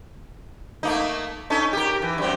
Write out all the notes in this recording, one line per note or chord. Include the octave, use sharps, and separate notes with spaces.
A3 A#3 D#4
C#4 D#4 A4
G4 A#4
E3
F#2 G3 C4